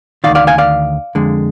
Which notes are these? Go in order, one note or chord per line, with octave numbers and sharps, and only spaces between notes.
C3 D#3 D5 F5
D2
D5 F5
F5 G#5
D5 F5
F2 D3 G#3